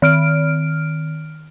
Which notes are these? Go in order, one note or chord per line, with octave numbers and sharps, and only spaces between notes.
D#3 F6 D7